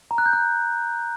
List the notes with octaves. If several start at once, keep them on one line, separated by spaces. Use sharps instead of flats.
A#5
F#6
G6
F#6